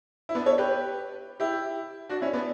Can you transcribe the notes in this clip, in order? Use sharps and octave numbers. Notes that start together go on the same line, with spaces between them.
E4
B3 D4
A4 C#5
G4 B4
E4 G4
D4 F#4
C#4 E4
B3 D4